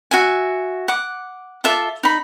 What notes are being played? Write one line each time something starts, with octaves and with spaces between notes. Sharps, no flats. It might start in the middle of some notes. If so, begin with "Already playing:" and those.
F#4 E5 G#5
F#5 D6
F4 A4 E5 D6
D#4 B5